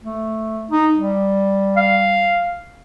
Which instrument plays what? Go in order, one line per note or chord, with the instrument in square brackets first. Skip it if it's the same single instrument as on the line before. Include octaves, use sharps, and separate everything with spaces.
[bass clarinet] A3
D#4
G3
[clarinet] F5